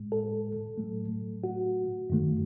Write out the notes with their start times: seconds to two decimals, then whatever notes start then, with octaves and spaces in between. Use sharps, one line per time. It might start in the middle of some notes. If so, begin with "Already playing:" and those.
Already playing: A2 G#3
0.12 A4
0.78 A2 F#3 A3
1.44 F#4
2.10 F#2 D#3 A3